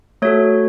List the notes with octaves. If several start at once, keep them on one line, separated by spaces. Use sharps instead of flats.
A3 F#4 A4 C#5